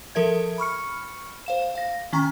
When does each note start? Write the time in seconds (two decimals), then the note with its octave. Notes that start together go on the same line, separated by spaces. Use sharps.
0.15 F3 A4 A#4 E5 G#6
0.58 B5 C#6 F6 C#7
1.46 C5 F5 E7
1.75 F5 A#6
2.13 D#3 C#4 G#5 A#5 C#6